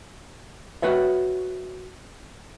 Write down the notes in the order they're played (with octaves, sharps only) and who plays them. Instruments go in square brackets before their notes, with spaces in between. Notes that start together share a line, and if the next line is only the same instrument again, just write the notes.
[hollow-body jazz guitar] F#4 B4 C#5 E5